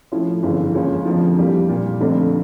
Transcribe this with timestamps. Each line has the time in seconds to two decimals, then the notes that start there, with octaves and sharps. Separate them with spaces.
0.12 A2 F3 C#4 E4
0.43 G1 F2 C#3 E3
0.74 C#2 C#3 F3 A#3 C#4
1.05 F1 F2 D3 F3
1.38 F2 E3 G3 A#3
1.69 A#2 G3 A#3
2.00 F1 F2 D3 A3 D4